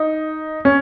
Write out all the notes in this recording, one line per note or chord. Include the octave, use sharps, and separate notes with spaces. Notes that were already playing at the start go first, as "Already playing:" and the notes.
Already playing: D#4
C#4